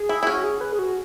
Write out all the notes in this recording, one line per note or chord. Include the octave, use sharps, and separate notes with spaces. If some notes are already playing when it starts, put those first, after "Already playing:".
Already playing: G#4
E4
E4
C#4 F#4
G#4
B4
G#4
F#4